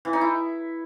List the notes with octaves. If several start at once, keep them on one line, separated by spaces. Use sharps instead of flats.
E3
D#4
E4